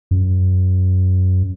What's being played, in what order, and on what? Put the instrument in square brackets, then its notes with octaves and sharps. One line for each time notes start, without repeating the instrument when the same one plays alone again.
[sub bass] F#2